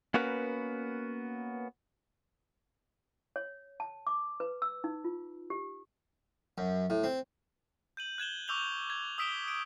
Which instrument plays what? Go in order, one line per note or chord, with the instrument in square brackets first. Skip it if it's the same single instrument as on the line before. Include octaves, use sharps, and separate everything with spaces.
[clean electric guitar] A#3 B3 C#4 F#4 A#4 B4
[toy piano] C#5
A5
D6
B4
E6
D#4
F4
G4
[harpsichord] F#2
A2
C4
[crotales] G6 D#7 F#7
F#6 G#6 E7 G7
C#6 D6 E6 G6 F7 G7
G#6
D#6 E6 B6 D7 E7 G7
D7